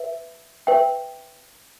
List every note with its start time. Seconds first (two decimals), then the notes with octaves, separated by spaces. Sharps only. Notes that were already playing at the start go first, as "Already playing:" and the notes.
Already playing: B4 E5
0.67 B4 E5 G5